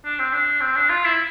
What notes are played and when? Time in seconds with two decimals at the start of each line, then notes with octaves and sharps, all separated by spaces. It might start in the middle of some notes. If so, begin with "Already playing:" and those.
0.05 D4
0.19 C4
0.33 D4
0.61 C4
0.76 D4
0.90 F4
1.05 E4